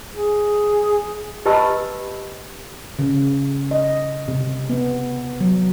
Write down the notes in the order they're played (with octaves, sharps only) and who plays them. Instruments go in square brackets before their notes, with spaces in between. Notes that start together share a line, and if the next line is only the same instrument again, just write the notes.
[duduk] G#4
[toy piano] G4 B4 D#5 A5 B5 E6
[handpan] C#3
D#5
C3
B3
F#3